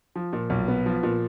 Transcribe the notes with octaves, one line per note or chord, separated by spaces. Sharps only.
F3
A#2
B1
B3
F3
A#2